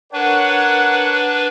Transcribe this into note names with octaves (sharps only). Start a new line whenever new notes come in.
D4 A#4 B4 C#5 F#5